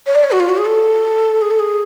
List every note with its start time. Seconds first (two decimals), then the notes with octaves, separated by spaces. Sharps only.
0.06 C#5
0.15 D5
0.24 C#5
0.31 F#4
0.40 F4
0.49 F#4
0.57 G#4
0.65 A4
1.41 G#4
1.51 A4
1.59 G#4